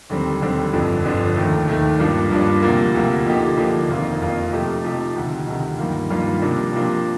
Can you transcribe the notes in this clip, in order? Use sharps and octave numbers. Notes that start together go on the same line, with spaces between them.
D#2 D3 G3 C4
D#2 D3 G3 C4
G1 F2 D3 F3
G1 F2 D3 F3
D#2 D#3 A3
D#2 D#3 A3
G2 F3 A#3 D4
G2 F3 A#3 D4
D2 C3 F3 A#3
D2 C3 F3 A#3
D3 F3 A#3 D#4 G4
D3 F3 A#3 D#4 G4
F1 F2 D#3 A#3 F4
F1 F2 D#3 A#3 F4
C3 F3 A3 D#4 G4
C3 F3 A3 D#4 G4
D2 C3 D#3
D2 C3 D#3
G2 D#3 G3 A#3 F4
G2 D#3 G3 A#3 F4
C3 F3 A#3 D4
C3 F3 A#3 D4